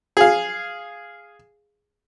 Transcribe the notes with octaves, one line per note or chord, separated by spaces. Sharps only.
G#4 F5